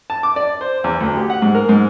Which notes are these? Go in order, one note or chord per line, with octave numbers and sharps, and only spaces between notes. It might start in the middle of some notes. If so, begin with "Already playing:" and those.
A5
D6
D5
C5
E2
D2
G4
F#5
G#2
A#4
G#2